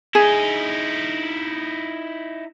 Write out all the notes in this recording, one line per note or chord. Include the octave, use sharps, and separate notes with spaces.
D#4 E4 G#4